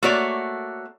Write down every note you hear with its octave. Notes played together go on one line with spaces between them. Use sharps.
A3 A#3 F#4 C#5 D5